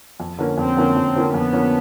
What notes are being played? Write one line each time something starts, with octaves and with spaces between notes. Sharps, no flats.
F2
D3 F3 A#3 C#4
F2 C4
D3 F3 A#3 C#4
F2
D3 F3 A#3 C#4
F2 B3
D3 F3 A#3 C#4